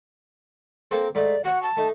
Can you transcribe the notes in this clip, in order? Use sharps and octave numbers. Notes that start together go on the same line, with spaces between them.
A#3 C4 A4 C5
G#2 A3 D5
F#4 C#5 F#5
A5
A3 D#4